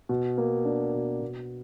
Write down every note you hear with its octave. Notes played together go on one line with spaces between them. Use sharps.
B2
A#3
D4
B2
B2